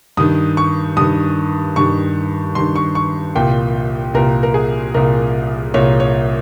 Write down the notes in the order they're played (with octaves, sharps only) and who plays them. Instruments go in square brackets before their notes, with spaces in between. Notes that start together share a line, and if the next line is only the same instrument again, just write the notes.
[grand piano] G2 D#3 D#6
C#6
G2 D#3 D#6
G2 D#3 C#6
G2 D#3 C6
C#6
C#6
C2 A#2 G5
C2 A#2 A#4
A#4
G#4
C2 A#2 A#4
C2 A#2 C#5
C#5